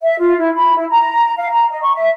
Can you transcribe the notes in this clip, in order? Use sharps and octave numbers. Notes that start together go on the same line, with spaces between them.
E5
F4
E4
B5
E4
A#5
F5
A#5
D#5
C#6
E5